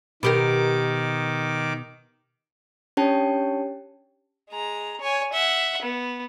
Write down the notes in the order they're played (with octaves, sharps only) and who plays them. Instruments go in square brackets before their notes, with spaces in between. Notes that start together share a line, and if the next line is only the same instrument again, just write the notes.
[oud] B2 G4 A#4 [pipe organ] D#3 D6
[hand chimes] C#4 D4 G4 C#5 G5 A5
[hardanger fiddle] G#3 A#5
C#5 G#5
E5 F#5
B3